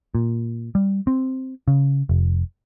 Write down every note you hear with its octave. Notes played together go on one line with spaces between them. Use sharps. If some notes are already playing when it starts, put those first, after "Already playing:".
A#2
G3
C4
C#3
F1